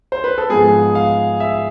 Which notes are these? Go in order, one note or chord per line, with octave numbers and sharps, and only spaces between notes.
C5
B4
A4
G#2 F3 G#3 B3 G#4
F5
E5